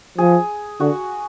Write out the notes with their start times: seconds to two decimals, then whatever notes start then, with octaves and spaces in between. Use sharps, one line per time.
0.18 F3 G#4
0.80 D3 F#4